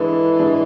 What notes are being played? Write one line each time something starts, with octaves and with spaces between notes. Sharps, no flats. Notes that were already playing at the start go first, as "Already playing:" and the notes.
Already playing: D3 E3 G#3 D4
D3 G#3 D4